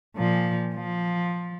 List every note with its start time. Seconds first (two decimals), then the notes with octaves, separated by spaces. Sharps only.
0.16 A#2 F3
0.75 F3